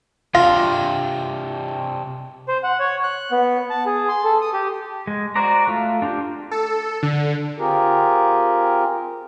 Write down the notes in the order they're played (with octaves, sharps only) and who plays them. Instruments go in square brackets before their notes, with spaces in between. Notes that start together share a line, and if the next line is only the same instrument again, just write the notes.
[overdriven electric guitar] C3 D4 [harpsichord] F4 [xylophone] F5
[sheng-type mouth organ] C5
F#5
C#5
F#6
B3
A5
G#4
C6
A4
D#6
G4
[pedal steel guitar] G#3
F#4 C5 D5 A#5
A3 F4
D4 F4 G4
[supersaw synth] A4
D3
[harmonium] C4 F4 G4 G#4 A#4